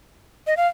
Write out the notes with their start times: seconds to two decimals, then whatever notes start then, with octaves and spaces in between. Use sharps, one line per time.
0.47 D#5
0.57 F5